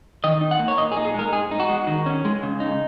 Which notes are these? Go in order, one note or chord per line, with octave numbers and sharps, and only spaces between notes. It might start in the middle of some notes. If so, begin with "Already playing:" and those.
D#3 D#5
D#4
F#5
A#3
C#5
A#2 D#5
G#4
D#4
G#4
G#3 A#4
G#2 G#4
D#4
F#4
G#3
D#3
C#4
G#3
C#3
D#4